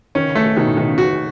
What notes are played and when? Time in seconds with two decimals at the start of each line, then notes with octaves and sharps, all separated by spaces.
0.15 D#3 C#4
0.26 C#3
0.35 D#3 A3
0.57 B2 D#3
0.68 A2
0.77 B2 D#3
0.88 C#3
0.98 F#4